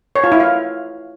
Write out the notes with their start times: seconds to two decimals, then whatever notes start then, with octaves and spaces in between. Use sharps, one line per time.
0.16 C#5
0.24 F4
0.32 E4
0.40 F5